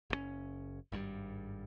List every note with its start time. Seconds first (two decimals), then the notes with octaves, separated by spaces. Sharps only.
0.10 F#1 B2 C#4
0.92 G#1 G2 C3 G3